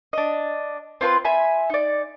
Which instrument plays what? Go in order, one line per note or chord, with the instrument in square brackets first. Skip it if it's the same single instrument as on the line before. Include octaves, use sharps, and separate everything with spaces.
[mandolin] D4 D#5
C4 F4 B4 C6
E5 G#5 B5
D#4 D5